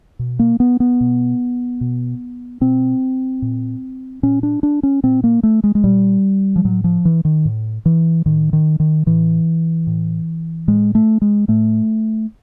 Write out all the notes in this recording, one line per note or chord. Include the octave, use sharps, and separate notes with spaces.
B2
A#3
B3
B3
B2
B2
B2 C4
A#2
A#2 C#4
D4
D4
C#4
A#2 C4
A#3
A3
G#3
G#3
A#2 G3
F3
A2 F#3
F3
E3
D#3
A2
E3
A2 D#3
D#3
D#3
A2 E3
A2
A2 G#3
A3
G#3
A2 A3